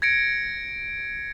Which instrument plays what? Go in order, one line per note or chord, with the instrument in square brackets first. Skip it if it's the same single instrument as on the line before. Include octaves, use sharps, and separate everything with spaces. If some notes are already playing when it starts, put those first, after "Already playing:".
[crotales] G#6 A#6 C#7 D7